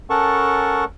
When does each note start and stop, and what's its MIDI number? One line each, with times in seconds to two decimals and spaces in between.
0.10 0.85 61
0.10 0.85 69
0.10 0.85 70
0.10 0.85 78
0.10 0.85 81
0.10 0.85 85